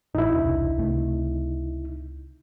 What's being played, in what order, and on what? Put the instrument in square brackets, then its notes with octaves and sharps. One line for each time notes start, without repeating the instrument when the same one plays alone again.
[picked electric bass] A1 [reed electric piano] D#4 E4
[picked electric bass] E1 C2 D4
C#2 C3 A3